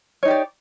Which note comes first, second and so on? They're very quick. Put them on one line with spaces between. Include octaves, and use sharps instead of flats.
C#5 D#4 G4 D5